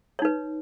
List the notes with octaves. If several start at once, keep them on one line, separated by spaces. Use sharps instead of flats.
D#4 B4 C#5